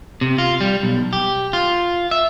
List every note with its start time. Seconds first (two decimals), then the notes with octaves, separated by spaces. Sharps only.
0.21 C3
0.38 F4
0.61 G3
0.83 B1
1.13 G4
1.53 F4
2.11 E5